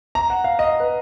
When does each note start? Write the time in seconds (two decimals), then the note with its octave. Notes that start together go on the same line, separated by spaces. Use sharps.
0.15 A#5
0.30 F#5
0.44 F5
0.59 D#5
0.80 B4